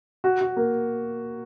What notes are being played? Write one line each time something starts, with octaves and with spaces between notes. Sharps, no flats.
F#4
F#4
A#3